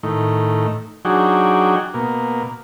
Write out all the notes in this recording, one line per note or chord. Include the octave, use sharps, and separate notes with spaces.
A2 D#3
F#3 D4 D#4 F#4 G#4 G5
B2 A#3